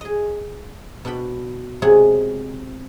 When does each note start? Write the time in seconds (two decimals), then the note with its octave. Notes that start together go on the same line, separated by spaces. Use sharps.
0.01 G#4 D#5
1.05 B2 D4 F#5 G5 B5
1.82 C3 G#3 G#4 C#5 F#5 G#5